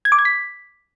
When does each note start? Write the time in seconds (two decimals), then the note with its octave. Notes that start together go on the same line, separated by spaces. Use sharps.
0.05 G#6
0.12 D6
0.19 G#6
0.25 B6